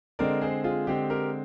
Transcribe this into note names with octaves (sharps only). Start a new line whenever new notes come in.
D3 G#3 C4 A#4 D5
G#4 C5
F4 G#4
D3 G#3 C4 G4
G4 A#4